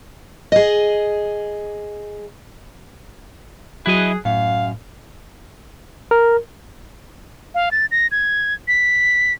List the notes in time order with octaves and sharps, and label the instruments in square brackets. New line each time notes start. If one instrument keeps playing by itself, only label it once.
[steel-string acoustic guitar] G#4 D#5
[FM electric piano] F#3 F#6 [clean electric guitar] E4 D#5 [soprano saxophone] G#4
[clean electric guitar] F#2 [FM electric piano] A2 [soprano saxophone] F5
[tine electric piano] A#4
[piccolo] F5
A6
A#6
G#6
B6